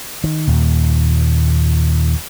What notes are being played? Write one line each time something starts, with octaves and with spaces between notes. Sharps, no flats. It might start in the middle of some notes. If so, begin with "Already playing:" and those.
D#3
D#2 A#2